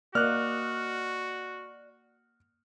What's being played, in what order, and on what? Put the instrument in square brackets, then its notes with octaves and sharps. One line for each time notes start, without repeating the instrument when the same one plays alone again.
[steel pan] A#3 [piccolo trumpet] F#4 [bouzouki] D5 D#5 [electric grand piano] F6 F#6